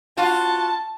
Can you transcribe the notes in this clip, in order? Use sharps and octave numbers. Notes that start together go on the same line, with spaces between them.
F4 F#4 A5